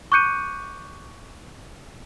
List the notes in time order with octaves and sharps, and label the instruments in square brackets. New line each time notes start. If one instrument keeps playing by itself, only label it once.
[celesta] C#6 D6 F#6 G6 C#7 D#7